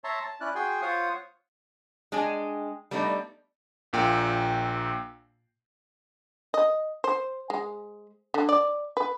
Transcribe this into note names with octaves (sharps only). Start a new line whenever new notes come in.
C#5 E5 A5 A#5 C6
A5
C#4 E4 D5 F#6
F#4 G#4 G5 G#5 C6
F4 C5 C#5 F5 F#5 D#6
G#3 D4 G5 G#5
G3 A3 B3 D4 D#4
A#1 A#2 G5
D#5
C5
G#3
D3
D5
B4